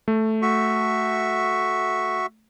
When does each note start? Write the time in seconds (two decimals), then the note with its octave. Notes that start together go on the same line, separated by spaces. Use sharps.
0.08 A3
0.42 F#4 E5 C#6